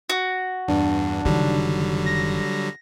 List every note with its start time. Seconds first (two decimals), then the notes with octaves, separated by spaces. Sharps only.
0.10 F#4
0.68 E2 G2 D4
1.25 F#1 D3 D#3 F#3 G3
2.06 A#6